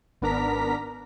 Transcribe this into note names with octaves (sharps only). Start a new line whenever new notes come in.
G#1 B3 D4 A#4 A#5 B6